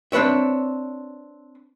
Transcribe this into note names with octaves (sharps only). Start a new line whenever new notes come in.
C4 D4 B4 C#5 E5